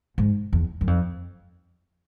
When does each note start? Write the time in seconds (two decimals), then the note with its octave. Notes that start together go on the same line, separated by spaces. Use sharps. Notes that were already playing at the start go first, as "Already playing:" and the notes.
0.18 G#2
0.53 E2
0.81 F#2
0.87 F2